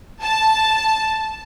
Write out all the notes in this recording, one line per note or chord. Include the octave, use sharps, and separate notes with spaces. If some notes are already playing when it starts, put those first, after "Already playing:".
A5